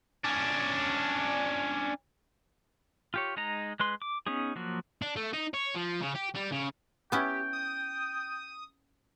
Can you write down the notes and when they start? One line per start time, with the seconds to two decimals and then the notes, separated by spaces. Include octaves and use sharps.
0.24 C#4 D4
3.14 F4 G4 C#5
3.37 G#3 D#4 D#5 A#5
3.80 G#3 B4 C6
4.02 D6
4.26 B3 C#4 D#4 G#4
4.56 F3 F#3 A#3 F#4
5.02 D4
5.16 A3
5.33 D#4
5.54 C#5
5.75 F3
6.01 C#3
6.15 G4
6.35 G3
6.52 C#3
7.12 B3 C#4 E4 G4 G5
7.53 D#6